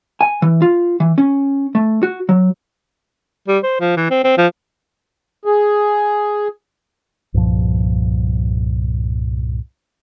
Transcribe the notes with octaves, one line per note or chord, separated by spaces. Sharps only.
G#5
E3
F4
E3
C#4
A3
F#4
F#3
G3
C5
F3
E3
C4
C4
F3
G#4
C2 G2 A#2 F3